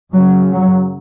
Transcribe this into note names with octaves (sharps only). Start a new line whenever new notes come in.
F#2 C#3 F#3
F#3